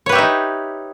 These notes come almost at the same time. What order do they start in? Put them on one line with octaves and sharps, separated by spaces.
C#5 B4 G4 E5 D#4